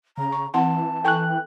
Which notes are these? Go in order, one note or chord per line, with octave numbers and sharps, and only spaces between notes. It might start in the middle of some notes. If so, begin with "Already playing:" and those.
C#3 A#5
C#6
E3 C4 F#5 A5 C6
A4 G5 G#5 C#6 F#6